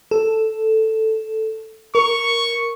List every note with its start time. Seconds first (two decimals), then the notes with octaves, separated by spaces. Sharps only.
0.11 A4
1.95 A#4 C#6